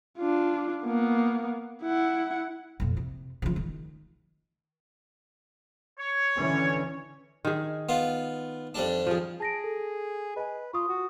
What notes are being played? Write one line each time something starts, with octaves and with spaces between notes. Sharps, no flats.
D4 F4
A#3 B3
E4 F#5
F2 A#2
C3
C#3 F3
D#3
C#5
D3 E3 C#4
D#3 G#4
B3 F4
F2 G3 D4
F3 G#4
G#4 A5 A#6 D7
A4
B4 D#5 G#5
F4 C#6 D#6
F#4